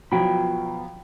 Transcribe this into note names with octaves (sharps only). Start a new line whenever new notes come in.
B2 F3 F#3 F4 G5 B5